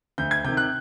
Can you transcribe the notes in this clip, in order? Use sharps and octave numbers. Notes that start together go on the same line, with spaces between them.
D2 G6
G#6
C3 D#3 G6
F#6